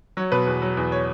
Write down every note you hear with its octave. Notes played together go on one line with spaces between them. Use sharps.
F#3 C#5
B2 B4
E2
F#3
E2
C#5